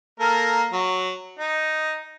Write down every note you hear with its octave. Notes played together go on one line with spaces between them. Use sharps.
A#3 A4 A#4
F#3
D#4